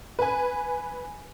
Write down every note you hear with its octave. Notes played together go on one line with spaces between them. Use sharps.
B4 G#5